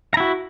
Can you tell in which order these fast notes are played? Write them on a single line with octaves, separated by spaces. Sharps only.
A#5 E4 F#4